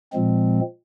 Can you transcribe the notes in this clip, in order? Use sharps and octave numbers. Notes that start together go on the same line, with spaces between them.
A#2 F3 G#3 C4